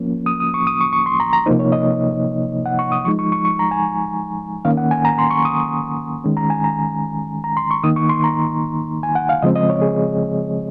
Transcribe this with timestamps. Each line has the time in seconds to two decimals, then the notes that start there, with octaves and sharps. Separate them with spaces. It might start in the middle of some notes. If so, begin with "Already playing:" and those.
Already playing: F3 A#3 C#4
0.26 D#6
0.40 D#6
0.54 C#6
0.67 D#6
0.81 C#6
0.93 C#6
1.06 C6
1.20 A#5
1.33 A#5
1.46 C3 F3 A#3 D#4 C5
1.59 C#5
1.72 D#5
2.66 F#5
2.79 C#6
2.92 D#6
3.05 F3 G#3 D#4 C#6
3.19 C#6
3.32 C#6
3.45 C#6
3.59 A#5
3.71 G#5
4.65 D#3 A#3 C#4 F5
4.77 F#5
4.91 G#5
5.05 A#5
5.18 C6
5.31 C#6
5.45 D#6
6.24 D#3 G#3 C#4
6.37 A#5
6.50 G#5
6.64 A#5
7.44 A#5
7.57 C6
7.71 C#6
7.83 D#3 A#3 D#4 D#6
7.96 C#6
8.09 C6
8.24 A#5
9.03 G#5
9.15 F#5
9.29 F5
9.42 C#3 F3 G#3 C4 D#5
9.55 D#5
9.70 C#5
9.82 G#4